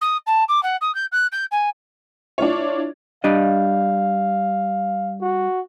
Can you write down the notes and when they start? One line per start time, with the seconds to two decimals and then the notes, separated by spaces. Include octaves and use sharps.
0.01 D#6
0.27 A5
0.48 D6
0.63 F#5
0.81 D#6
0.95 G6
1.12 F#6
1.32 G6
1.51 G#5
2.38 D4 E4 F4 C#5
3.24 G3 D4 D#5 F5
5.21 F#4